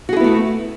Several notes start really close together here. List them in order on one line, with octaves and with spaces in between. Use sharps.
F#4 G#4 E4 B3 A3